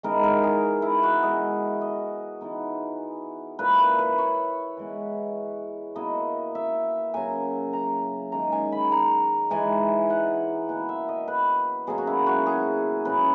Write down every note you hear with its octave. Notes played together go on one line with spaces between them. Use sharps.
E3 G#3 B3 D#4 A#4
A#4
G#4
E4
F#4
E3 G#3 B3 D#5
D#5
E3 B3 D#4
A#2 A#3 E4 B4
B4
B4
C#5
E3 G#3 B3
B2 A#3 E4 D#5
E5
C#3 F#3 A#3 G#5
A#5
D#3 G#3 C#4 A#5
G#5
B5
A#5
E3 G#3 D#4 G#5
F#5
B2 A#3 E4 F#5
E5
D#5
B4
B2 F#3 A#3 C#4 G#4
F#4
E4
F#4
G#4
F#2 C#3 F#3 B3 B4